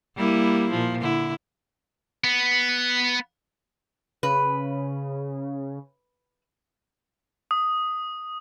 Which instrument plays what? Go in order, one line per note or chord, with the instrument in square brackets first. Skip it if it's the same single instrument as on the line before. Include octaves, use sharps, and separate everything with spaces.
[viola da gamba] G3 A#3 E4
A#2 F3
D3 E4
[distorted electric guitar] B3
[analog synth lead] C#3 [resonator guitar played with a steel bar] B4
[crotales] D#6